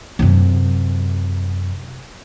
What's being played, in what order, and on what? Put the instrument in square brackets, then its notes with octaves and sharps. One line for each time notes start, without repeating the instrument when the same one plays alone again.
[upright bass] F#2 C3